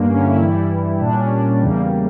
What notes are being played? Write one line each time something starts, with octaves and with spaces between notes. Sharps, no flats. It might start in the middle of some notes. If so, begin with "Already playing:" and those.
Already playing: G2 D3 G3 A#3
C#4
E4
G2 E3 G3
A#2 G3 D4
C#4
D4
E2 C#3 E3 G3 A#3